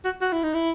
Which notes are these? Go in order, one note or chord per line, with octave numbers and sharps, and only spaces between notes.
F#4
F#4
E4
D#4
E4